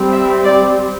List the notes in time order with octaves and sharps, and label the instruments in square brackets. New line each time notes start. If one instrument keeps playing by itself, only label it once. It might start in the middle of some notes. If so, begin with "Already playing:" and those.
Already playing: [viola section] G3 C4
E5
D5